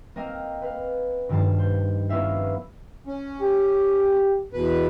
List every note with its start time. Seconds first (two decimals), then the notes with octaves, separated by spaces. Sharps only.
0.16 A#3 C4 A#4 D#5 F5
0.62 B4 F5
1.29 G2 B2 D#3 F3 A5 C7
1.59 C5
2.09 A#3 B3 C#4 E4 E5 F5
3.07 C#4
3.41 G4
4.53 E2 B2 B4